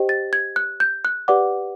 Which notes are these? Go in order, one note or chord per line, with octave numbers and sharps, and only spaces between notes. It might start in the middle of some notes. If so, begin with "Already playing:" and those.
Already playing: G4 C5 D#5 G5
A6
G#6
F#6
G6
F#6
G4 B4 D5 F#5 D6